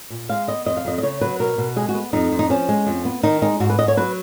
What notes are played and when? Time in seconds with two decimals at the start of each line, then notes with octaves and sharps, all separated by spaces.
0.10 A#2
0.29 G#3 F5
0.48 B3 D#5
0.66 F2 D#5
0.77 F5
0.85 F2 D#5
0.98 D#5
1.03 C#3 C#5
1.21 F#3 B4
1.40 B2 A#4
1.58 B2
1.76 G#3 G#4
1.89 F#4
1.95 B3
2.13 F2 D#4
2.31 F2
2.39 D#4
2.50 F3 C#4
2.69 G#3
2.87 F2
3.05 B3
3.23 D#3 D#4
3.42 G#3 D#4
3.60 G#2 F#4
3.70 B4
3.79 G#2 D#5
3.88 C#5
3.97 F#3 B4